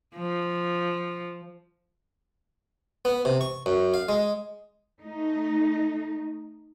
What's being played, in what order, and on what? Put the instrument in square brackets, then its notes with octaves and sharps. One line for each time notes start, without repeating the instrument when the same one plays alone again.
[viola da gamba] F3
[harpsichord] B3
C3
C#6
F#2
F5
G#3
[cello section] A3 D#4